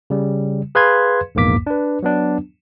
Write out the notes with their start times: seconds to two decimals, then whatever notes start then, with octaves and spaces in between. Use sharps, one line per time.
0.10 C#3 G3
0.75 G#4 B4 F5 C6 G#6
1.35 A#1 E2 G#2 A#3 D6 B6
1.67 D4 B4
2.03 F#3 B3 D4